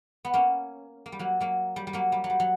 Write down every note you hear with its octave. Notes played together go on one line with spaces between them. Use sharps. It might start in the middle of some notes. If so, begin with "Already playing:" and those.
B3
A#3 C#4
A#3
G3
F#3 A#3
F#3 A#3
G3
G3
F#3 A#3
G3
F#3
G3
F#3